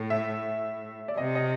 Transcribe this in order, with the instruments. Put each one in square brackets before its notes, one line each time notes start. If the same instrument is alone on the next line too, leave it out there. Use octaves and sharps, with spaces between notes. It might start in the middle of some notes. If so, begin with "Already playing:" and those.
Already playing: [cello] A2
[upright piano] E5
D5
[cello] C3 [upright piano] D#5
[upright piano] D#5